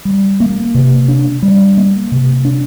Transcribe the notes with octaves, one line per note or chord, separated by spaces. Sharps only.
G3
A#3
C3
D4
G3
A#3
C3
D4